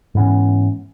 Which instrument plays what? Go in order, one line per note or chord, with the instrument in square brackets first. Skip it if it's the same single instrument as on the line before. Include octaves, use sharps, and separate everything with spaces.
[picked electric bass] G#2 E3 B3 C#4